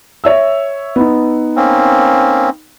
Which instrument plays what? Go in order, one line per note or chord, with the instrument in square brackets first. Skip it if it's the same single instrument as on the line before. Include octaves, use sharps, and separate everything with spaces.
[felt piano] C#5 E5 E6
B3 D#4
[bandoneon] A#3 C4 C#4